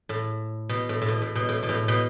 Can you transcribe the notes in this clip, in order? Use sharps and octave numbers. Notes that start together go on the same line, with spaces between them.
A2
B2
A2
A2
B2
A2
B2
A2
B2
A2
B2